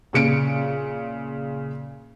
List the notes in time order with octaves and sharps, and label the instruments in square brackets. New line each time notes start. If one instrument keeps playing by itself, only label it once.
[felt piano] A#2 C#3 C#7 D7